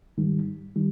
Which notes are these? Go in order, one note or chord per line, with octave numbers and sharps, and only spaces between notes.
G#2 D#3 G3
D#3 G3